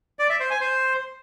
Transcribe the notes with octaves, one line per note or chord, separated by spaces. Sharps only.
D5
E5
C5
G#5
C5